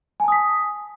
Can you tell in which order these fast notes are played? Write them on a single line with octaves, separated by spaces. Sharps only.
G#5 A5 D#6 B6